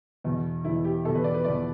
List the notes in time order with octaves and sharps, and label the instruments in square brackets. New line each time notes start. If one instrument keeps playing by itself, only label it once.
[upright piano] E2 B2
E2 B2 E4
G4
E2 B2 A4
B4
D5
B4
E2 B2 D5